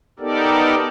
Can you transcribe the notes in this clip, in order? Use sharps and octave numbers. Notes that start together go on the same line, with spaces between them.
B3 D#4 G4 A4 A#4 D5